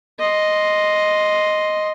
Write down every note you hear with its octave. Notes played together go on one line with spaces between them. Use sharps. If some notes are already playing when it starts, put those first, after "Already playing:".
D#5 C6